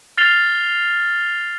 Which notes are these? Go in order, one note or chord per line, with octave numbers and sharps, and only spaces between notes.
F6 A6 C7 F7 G7